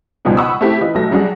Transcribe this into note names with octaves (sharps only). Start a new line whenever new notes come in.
C#2 G#2 B2 F3 G3 G#3
F#5 B5 C#6 D#6 E6
A3 C4 E4 G4
E3 F4 B4 D#5
B1 F#3 A3 A#6
F#3 G3 D4 F#4 G#4